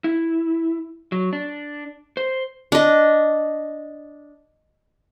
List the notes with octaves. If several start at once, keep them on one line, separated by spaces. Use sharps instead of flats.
E4
F#3
D4
C5
D4 D#5